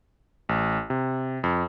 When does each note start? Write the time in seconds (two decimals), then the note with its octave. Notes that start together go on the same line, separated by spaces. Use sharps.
0.49 A1
0.90 C3
1.44 F2